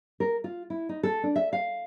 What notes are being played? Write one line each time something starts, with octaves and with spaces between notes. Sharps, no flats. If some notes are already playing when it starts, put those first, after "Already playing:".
A#4
F4
E4
D#4
A4
D4
E5
F5